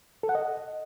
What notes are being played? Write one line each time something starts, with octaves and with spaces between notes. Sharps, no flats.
A4
F#5
D#5